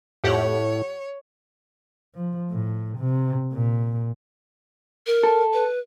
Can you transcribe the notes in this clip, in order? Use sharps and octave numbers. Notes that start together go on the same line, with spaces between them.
F2 A2 G4 C#5 F#5
F3
A2
C3
A#2
A#4
A4
B4